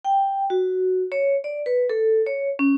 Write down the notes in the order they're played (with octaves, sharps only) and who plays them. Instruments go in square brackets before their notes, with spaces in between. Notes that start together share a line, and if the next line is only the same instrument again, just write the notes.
[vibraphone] G5
F#4
C#5
D5
B4
A4
C#5
C#4